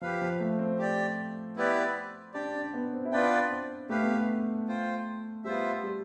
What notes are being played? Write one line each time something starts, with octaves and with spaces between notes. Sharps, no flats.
F3 G4 B4 F5
F3
A3
C4
G4 D5 G5
B3 E4 G4 B4 D5
D4 G4 D5 G5
D4
B3
C4
E4
B3 D4 F4 B4 D5 G5
C4
A3 G4 B4 F5
B3
A3
F4 C5 G5
G3 B3 F4 C5 E5
G3